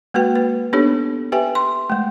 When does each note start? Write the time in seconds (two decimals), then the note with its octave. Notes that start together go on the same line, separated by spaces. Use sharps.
0.14 G#3 A#3 F#4 B4 G5
0.35 B4
0.73 B3 D4 D#4 G4 A4 C#5
1.32 G4 B4 E5 G5 G#5
1.55 C6
1.90 G#3 A3